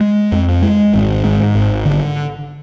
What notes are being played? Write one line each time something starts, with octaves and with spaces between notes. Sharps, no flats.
G#3
F2
G#3
G#1
G#2
G#1
D3